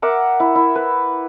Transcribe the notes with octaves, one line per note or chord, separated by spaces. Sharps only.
A#4 E5 F#5 D6
E4
E4
B4